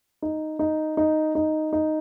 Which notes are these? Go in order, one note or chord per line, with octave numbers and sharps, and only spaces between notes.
D#4
D#4
D#4
D#4
D#4